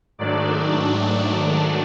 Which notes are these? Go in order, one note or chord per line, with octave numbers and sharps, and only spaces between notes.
G#2 D#3 F#3 A3 D4 D5